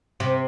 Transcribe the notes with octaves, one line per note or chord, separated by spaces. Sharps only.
C3